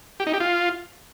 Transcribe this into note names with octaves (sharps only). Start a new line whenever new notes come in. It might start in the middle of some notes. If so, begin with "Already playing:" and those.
G4
D#4
G4
F4